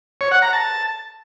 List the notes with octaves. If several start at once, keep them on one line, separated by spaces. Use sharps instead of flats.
C#5
F#5
A#5
A5